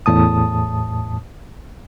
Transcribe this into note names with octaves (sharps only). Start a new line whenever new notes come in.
E2 A2 A5 D#6